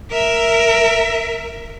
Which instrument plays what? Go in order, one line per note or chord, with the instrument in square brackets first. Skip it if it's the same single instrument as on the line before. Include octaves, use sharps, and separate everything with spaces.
[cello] A#4 E5